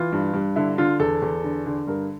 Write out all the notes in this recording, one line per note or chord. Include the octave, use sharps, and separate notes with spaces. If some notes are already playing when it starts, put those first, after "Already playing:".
Already playing: E3 F4
G2
G2
D3 E4
D3 F4
E2 A4
E2
D3
D3
G2 A#4